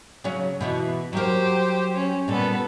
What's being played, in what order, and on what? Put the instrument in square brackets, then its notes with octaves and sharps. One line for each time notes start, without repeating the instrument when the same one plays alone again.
[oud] C#3 F#3 C#4
B2 E3
[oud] F#3 A#4 [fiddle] G4 C5
[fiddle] C#4
[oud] A#2 G3 [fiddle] B3 A4